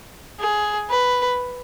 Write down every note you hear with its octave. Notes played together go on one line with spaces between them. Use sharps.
G#4
B4